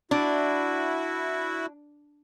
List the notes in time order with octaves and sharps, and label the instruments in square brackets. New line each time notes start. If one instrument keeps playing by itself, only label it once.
[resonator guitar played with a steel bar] D4 [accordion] E4 F#4